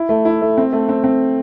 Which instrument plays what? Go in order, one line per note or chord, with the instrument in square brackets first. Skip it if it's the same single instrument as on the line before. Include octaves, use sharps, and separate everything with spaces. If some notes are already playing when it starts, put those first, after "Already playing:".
Already playing: [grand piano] E4
A3
E4
A3
C4
A3
C4
C4